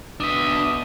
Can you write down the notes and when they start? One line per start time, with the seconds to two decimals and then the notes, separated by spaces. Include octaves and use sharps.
0.20 B2 D4 E5 D#6